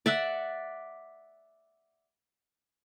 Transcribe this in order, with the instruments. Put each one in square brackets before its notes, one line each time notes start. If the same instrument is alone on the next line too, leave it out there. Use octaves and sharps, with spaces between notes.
[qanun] D5 E5 F#5